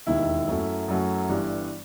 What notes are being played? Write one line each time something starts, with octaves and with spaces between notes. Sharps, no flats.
E1 D#2 D#3 E4
F#2 F#3 A3
F#2 F#3 A3
G1 G2 E3 G3